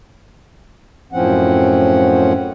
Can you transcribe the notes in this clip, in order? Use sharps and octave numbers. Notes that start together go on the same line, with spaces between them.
F#2 A2 F3 C4 C#4 F#5